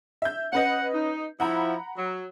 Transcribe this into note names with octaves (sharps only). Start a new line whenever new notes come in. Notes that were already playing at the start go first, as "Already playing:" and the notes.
E5 G6
C#4 B4 D#5 F#5
D#4
F3 E4 F#5 A#5 B5
F#3